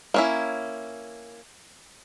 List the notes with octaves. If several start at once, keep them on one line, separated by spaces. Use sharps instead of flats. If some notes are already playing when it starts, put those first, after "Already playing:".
A#3 C#4 E4